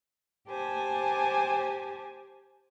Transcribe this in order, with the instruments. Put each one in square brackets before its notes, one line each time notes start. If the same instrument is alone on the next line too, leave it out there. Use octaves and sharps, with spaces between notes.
[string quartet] G4 C5 G#5 A5